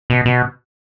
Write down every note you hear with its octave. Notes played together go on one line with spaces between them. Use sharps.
B2
B2